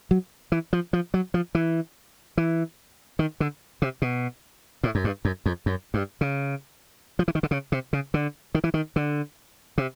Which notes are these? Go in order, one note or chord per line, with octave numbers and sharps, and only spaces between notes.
F#3
E3
F3
F3
F#3
F3
E3
E3
D#3
D3
C3
B2
A2
F#2
G2
F#2
F2
F#2
G2
C#3
F3
E3
D#3
D3
C#3
C3
C#3
D3
D#3
E3
D#3
D3
C3